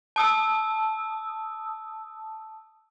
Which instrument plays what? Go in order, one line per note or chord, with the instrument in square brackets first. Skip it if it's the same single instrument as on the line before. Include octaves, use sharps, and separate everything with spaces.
[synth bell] A5 D#6 E6